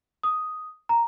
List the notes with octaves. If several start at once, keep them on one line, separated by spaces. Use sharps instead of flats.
D#6
A#5